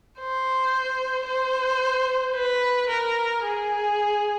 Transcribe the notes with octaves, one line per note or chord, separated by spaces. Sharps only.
C5
C5
B4
A#4
G#4